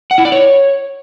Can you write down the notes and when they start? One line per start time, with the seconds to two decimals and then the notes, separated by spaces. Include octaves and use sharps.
0.11 F#5
0.18 E4
0.25 D5
0.32 C#5